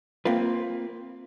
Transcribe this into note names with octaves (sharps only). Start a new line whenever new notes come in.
A#3 C4 F4 B4